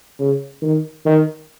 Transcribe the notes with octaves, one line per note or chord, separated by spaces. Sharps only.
C#3
D#3
D#3